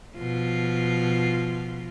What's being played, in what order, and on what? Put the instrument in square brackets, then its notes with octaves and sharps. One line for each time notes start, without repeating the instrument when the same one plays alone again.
[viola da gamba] B2 F3 F4